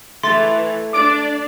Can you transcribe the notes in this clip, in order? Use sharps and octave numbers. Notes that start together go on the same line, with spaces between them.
E3 A3 C6 A6
D4 D5 D6 D7